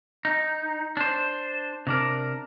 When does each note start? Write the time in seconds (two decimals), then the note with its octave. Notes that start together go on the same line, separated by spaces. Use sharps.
0.25 D#4
0.97 D4 C5
1.87 C3 D4 A#4